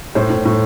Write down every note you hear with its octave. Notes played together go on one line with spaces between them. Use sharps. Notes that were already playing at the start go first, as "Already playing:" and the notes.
A2 C5
A2
A2